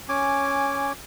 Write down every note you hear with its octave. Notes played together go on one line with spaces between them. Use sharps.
C#4 G#5 D6